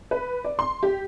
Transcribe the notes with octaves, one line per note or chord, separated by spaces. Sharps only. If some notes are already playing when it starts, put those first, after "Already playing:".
B4
D5
C6
G4